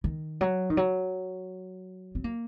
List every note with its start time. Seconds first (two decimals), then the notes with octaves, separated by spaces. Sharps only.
0.04 D#3
0.41 F#3
0.70 D#3
0.77 F#3
2.15 C4
2.24 A#3